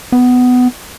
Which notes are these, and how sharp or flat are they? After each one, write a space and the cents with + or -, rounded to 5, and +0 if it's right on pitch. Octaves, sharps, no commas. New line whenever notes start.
B3 +15